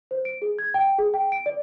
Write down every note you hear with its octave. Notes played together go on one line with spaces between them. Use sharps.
C5
D7
G#4
G#6
G5
G#4
G5
D7
D5